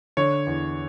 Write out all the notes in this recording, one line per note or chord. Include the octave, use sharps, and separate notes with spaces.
D3 C#5
E2